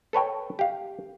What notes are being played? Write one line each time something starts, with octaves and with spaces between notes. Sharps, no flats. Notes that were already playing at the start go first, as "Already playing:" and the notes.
A4 B4 C#5 G5
G4 F5